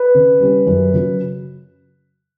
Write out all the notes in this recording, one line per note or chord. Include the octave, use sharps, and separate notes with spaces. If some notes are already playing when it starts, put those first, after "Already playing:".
Already playing: B4
C#3
G3 C#4
F#2
C#3 F#3